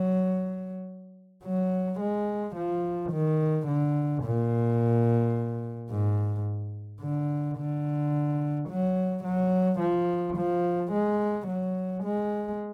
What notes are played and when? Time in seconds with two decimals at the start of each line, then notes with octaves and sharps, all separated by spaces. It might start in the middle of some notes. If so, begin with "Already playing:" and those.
Already playing: F#3
1.44 F#3
2.00 G#3
2.55 F3
3.12 D#3
3.67 D3
4.23 A#2
5.90 G#2
7.01 D3
7.58 D3
8.69 F#3
9.24 F#3
9.79 F3
10.36 F3
10.92 G#3
11.47 F#3
12.03 G#3